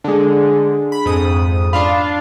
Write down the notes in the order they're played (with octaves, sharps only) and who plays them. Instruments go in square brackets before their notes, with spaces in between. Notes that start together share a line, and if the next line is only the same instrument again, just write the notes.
[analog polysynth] D3 G#3 [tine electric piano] D4 G#4
[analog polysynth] B5
F2 G#2 D#6
[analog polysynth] D4 F4 F5 [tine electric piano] B5